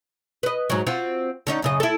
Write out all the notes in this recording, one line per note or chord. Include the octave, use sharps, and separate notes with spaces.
B4 D#5
G#2 F#3
C4 F4 F#4
D3 C#4 D#4
F#2 C#3 D#5
E4 A4